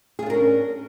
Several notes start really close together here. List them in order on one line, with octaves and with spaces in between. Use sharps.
G#4 F4 D4 A#4 C#4